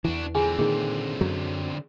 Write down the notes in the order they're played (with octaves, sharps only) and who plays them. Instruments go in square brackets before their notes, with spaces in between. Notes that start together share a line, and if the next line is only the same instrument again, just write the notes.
[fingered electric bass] E2 E3 [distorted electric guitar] D4 F#4
[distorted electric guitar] D3 C4 [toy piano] F4 G#4 G#5
[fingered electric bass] A#2 D#3 [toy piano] G#4
[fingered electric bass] F#2 F#3